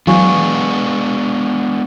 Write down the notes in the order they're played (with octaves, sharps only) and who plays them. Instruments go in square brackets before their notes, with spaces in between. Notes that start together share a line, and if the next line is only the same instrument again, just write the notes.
[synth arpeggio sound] E3 F#3 [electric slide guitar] G#3 B3 D4 [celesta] F5 G#5 C#6